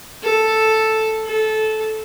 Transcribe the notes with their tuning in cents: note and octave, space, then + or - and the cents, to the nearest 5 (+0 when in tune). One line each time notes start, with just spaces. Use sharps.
A4 +0
A4 -15